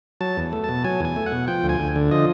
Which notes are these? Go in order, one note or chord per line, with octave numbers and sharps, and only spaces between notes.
F#3 A5
E2
A3
B2 A5
F#3 G#5
E2 G#5
A3
F#5
B2
F3 G5
D2
G#5
D2
D3
F3 D#5